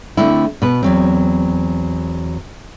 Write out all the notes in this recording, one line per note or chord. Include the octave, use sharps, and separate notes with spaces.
D3 A3 C4 E4
B2 B4
E2 F#3 C4